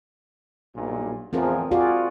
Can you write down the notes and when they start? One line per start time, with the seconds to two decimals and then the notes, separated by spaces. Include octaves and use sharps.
0.75 B1 G2 A#2
1.33 E2 A2 F3 C4 G#4 A#4
1.71 F4 F#4 G#4 D5